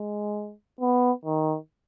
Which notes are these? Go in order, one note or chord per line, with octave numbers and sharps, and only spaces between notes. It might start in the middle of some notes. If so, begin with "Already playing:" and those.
Already playing: G#3
B3
D#3